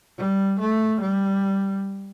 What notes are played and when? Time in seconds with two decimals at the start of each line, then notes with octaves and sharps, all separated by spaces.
0.18 G3
0.59 A3
1.00 G3